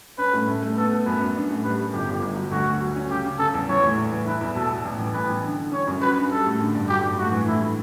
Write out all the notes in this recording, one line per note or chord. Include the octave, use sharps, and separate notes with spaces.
C#4 B4
A2
A3
A3
B3 A4
B3
F#2 B4
F#2
D4
A2
G3 B4
G3
G1 G4
G1
G1
F#3
D2 F#4
D2
F#3
C#4
C#3 G4
C#3
C#3 A4
E2
E3 C#5
A2
A2
E3
E4 B4
E2
B2 A4
B2
A1
E3
A1 B4
E3
D3
D3
C#4 C#5
F#2
F#4 B4
D4
G3 A4
A2
D3
G2
F#3 G4
G2
A2 F#4
E3
A2 E4
A2